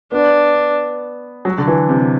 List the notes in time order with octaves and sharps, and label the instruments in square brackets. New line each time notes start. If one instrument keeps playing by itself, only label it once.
[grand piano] B3 [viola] D4
[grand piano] F#3
D3
E3
C3